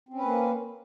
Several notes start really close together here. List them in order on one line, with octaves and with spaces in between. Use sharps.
C4 C#4 B4 A#3